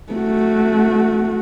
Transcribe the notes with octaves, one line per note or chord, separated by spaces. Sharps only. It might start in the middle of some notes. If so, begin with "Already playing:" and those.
A3 F#4